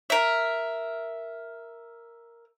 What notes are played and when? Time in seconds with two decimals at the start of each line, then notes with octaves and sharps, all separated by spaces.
0.10 A#4 E5